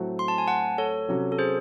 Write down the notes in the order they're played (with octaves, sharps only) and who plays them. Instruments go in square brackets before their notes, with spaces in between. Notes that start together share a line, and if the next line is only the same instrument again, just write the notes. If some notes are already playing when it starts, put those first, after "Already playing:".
Already playing: [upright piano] A2 F#3 A3 C4 F#4
[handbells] C6
A5
G#5
F#5 A5
A4 C#5
[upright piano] C3 F#3 C#4 F#4
[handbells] A4
G#4 C5